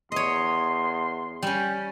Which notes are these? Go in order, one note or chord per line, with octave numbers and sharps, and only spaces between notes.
E2 C#5 D#5 C6
G3 C#4 G5